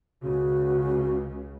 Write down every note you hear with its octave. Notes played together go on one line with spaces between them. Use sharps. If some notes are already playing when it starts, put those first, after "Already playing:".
C#2 C#3 F#4